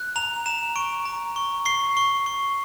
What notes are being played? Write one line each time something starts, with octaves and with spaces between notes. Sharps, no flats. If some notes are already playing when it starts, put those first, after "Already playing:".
Already playing: F#6
A#5 F7
A#5 E7
C#6 D7
A#5
C#6
C#6 C7
C#6
C#6